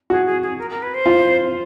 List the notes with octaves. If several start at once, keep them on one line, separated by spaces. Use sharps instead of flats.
F#4 G#4
G#4
G#4
A#4
A#4
B4
C5
F4